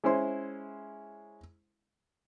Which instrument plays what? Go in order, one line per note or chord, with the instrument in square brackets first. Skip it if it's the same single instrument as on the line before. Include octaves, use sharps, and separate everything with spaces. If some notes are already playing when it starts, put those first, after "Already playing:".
[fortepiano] G#3 C#4 E4 C5 C6